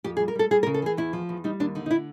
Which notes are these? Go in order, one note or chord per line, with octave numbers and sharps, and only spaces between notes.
F2 G4
G#4
G3
A#4
G3 A4
G3 G#4
A#4
C#3
A4
E3 G#4
E2 E4
F3
E2
G3 D#4
D#2 D4
D3 D#4
D#4
E4